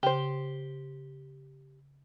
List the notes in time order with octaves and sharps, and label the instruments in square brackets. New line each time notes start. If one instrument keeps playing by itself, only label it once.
[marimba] C#3 [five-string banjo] G4 C5